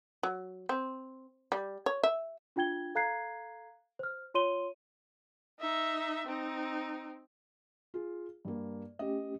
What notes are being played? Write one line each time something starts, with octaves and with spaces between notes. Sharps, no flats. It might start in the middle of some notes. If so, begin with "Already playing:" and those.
F#3
C4
G3
C#5
E5
D4 F4 G5 G#6 G7
A4 F5 A#5 F#6 G#6 C7
C5 F6
F4 C#5 C6 D#7 G7
D#4 E5
C4 D#4
F4 G#4
G2 A#3
A3 C#4 G4 D#5